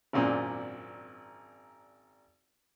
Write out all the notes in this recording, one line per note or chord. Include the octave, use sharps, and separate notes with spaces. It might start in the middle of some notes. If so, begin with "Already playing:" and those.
G#1 F#2 A#2 C4 D4